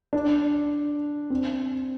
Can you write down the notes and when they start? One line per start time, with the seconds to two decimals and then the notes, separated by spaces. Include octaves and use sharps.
0.13 D4
1.30 C4